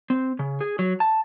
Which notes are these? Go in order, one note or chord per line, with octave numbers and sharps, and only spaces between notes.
C4
C#3
G#4
F#3
A5